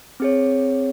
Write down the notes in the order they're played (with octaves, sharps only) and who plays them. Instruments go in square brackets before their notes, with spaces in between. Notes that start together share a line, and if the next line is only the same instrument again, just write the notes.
[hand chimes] C4 G#4 C#5